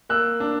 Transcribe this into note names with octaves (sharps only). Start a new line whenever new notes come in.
A#3 E6 F#6
D4